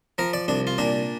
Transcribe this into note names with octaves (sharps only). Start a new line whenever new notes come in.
F3 A#4
D5
C2 D4
F4
A#2 D4